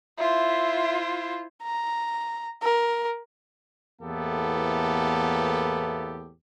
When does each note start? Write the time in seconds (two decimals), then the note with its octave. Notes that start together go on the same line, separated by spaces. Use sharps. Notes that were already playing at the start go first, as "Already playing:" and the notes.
0.18 E4 F4 C5 E5
1.63 A#5
2.63 A#4
4.02 E2 A2 A#3 B3 G4 A4